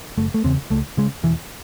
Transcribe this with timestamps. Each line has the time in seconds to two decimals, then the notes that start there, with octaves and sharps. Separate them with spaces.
0.17 F#1 A3
0.34 A3
0.44 E2 C#3 C4
0.70 C#2 A3
0.97 C#3 G#3
1.23 E1 E3